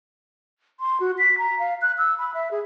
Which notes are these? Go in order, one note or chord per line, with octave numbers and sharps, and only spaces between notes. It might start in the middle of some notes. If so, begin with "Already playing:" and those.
C6
F#4
B6
A#5
F5
F#6
E6
B5
E5
G#4